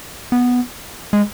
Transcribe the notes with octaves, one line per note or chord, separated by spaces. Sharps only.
B3
G#3